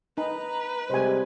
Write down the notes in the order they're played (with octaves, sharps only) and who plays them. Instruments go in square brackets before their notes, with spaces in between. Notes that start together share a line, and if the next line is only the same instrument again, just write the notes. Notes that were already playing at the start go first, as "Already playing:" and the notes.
[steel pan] D#4 [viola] B4 [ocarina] A#5
[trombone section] C3 G3 G#3 [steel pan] C5 G#5 [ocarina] D#5